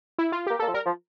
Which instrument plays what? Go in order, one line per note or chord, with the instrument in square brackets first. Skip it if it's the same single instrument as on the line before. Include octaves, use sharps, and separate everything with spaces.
[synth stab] E4
F4
[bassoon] A#3 [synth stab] G4
[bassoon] A#3 [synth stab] A4
[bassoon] F3
[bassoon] G3 [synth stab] A#4
[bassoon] F3